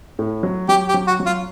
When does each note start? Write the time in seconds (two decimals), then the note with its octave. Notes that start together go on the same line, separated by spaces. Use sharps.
0.19 A2
0.43 F#3
0.69 F#3 G4
0.88 G4
0.94 F#3
1.07 F#4
1.20 F#3
1.26 F4